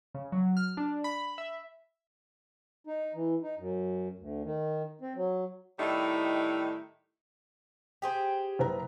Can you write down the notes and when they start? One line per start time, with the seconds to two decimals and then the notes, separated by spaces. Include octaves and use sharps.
0.15 C#3
0.32 F#3
0.57 F6
0.77 D4
1.04 B5
1.38 E5
2.87 D#4
3.14 E3
3.42 D#4
3.58 F#2
4.19 D2
4.44 D#3
5.01 C4
5.15 F#3
5.79 A2 D#3 G3 D#4 E4
8.02 G4 G#4 C5
8.59 F#1 B4 A#5